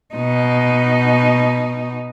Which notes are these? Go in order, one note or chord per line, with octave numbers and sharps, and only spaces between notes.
B2 D#4